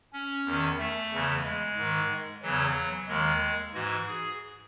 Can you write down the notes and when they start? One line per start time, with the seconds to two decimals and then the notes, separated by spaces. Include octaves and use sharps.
0.13 C#4
0.45 E2 D#3
0.79 A3
1.12 E2 C#3 E3
1.44 G#3
1.77 G#2 D#3
2.42 E2 C#3 E3 F#3
3.08 D#2 D#3 G#3
3.74 G#2 E3 F#4
4.07 G#4